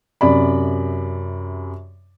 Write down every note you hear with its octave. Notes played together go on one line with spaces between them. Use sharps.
F#2 C3 D5 B5